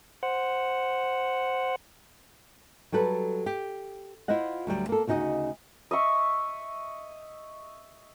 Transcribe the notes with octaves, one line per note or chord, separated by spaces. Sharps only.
C5 F#5
F#3 G3 A4 B4
G4
E4 F4 C5 D#5 F#5
D2 F#3 G3
A#3 A4
D2 C#3 D#4 F#4 D#5
D#5 E5 C#6